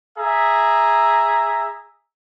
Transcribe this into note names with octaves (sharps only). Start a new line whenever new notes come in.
G#4 E5 A#5